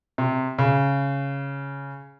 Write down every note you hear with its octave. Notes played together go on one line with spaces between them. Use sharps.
C3
C#3